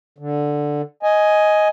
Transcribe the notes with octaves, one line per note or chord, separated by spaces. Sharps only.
D3
D#5 G#5